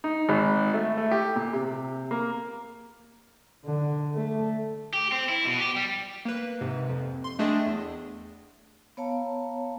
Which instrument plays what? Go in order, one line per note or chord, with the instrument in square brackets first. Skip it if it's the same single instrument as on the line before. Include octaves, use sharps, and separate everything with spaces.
[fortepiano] D#4
G#1
A3
A3
G4
A#2
C3
A#3
[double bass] D3
A3
[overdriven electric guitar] G4
C4
E4
B2
G4
G3
[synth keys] A#3 B4
G#2 C3
F2
C6
A3 D4 G#4 D#5 G5
E2
[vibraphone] B3 C#5 F5 A5 A#5